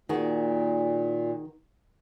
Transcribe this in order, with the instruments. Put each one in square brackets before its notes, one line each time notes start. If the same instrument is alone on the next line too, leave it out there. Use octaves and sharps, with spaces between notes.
[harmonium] A#2 [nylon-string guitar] D#3 F#4 G#4